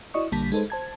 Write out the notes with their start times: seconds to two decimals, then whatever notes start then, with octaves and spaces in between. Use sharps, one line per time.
0.14 E4 F#4 D5 D#5 C#6 D#6
0.32 A#1 D3 G3 A#3 A5 B6
0.52 G#3 D#4 A4 B4 C5
0.70 C5 A5 G#6